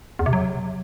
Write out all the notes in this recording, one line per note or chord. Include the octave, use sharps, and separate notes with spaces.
E2
C3
F#3